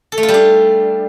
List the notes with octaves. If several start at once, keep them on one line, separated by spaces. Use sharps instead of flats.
A4
A3
F4
G3
D4